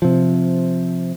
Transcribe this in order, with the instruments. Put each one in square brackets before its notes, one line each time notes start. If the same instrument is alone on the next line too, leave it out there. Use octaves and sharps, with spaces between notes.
[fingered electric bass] C3 F3